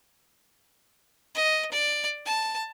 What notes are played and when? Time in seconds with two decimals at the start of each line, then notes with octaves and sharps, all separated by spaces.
1.35 D#5
1.71 D5
2.25 A5